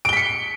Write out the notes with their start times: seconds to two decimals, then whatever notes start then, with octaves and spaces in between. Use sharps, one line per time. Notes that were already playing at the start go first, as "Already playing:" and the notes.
0.05 D7
0.09 G7
0.13 B6
0.17 C#7